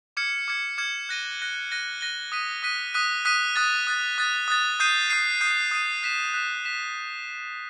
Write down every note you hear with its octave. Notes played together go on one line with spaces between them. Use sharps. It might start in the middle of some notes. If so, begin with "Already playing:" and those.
D6 F6 G#6 C#7
D6 F6 G#6 C#7
D6 F6 G#6 C#7
F#6 A#6 D#7 G7
F#6 A#6 D#7 G7
F#6 A#6 D#7 G7
F#6 A#6 D#7 G7
D#6 F#6 B6 D#7
D#6 F#6 B6 D#7
D#6 F#6 B6 D#7
D#6 F#6 B6 D#7
D#6 F#6 A6
D#6 F#6 A6
D#6 F#6 A6
D#6 F#6 A6
D#6 G6 C7 D#7
D#6 G6 C7 D#7
D#6 G6 C7 D#7
D#6 G6 C7 D#7
F#6 B6 E7
F#6 B6 E7
F#6 B6 E7